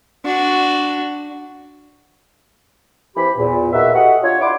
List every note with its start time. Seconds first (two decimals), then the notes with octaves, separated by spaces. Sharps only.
0.25 D4 F#4
3.16 E3 C4 G4 B5
3.38 E2 A#2
3.73 A#3 D#4 F#4 A#4 B4 E5
3.94 F#4 G4 A4 D#5 F#5
4.22 D4 F4 C#5
4.42 E4 D5 F#5 B5 C6 D6